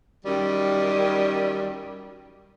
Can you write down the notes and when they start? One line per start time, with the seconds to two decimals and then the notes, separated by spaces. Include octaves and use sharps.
0.24 F#2 D#3 G3